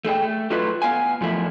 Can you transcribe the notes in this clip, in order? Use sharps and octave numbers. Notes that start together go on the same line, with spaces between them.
A3 G#4 A4 G5
A3
F#3 A3 E4 F4 B4
B3 F5 G#5
F#2 F3 A3 E4